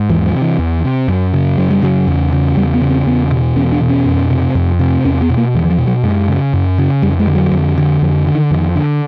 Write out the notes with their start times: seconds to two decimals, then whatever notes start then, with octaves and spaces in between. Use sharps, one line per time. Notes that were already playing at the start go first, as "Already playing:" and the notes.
Already playing: G#2
0.09 E2 E3
0.26 F3
0.35 C3
0.42 E3
0.59 E2
0.84 C3
1.08 F#2
1.34 C#3
1.58 F#2 F#3
1.70 G3
1.82 C#3 F#3
2.07 E2
2.32 C#3
2.57 E2 G3
2.74 B3
2.82 C#3
2.91 C4
3.06 E2 B3
3.31 B2
3.56 E2 C#4
3.72 D4
3.81 B2
3.89 C#4
4.05 F2
4.30 C3
4.55 F2
4.79 C3
5.05 E2 C#4
5.21 B3
5.30 B2
5.37 A#3
5.55 E2 E3
5.65 E3
5.70 F3
5.78 B2
5.87 F#3
6.03 F#2 G#3
6.29 C#3
6.54 F#2
6.78 C#3
7.02 F2 G3
7.20 G#3
7.27 D3
7.35 F#3
7.52 F2
7.78 D3
8.02 F2 F3
8.27 D3
8.35 D#3
8.51 F2 D#3
8.76 D3